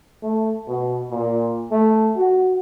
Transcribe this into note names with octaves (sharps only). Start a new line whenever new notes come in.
A3
B2
A#2
A3
F#4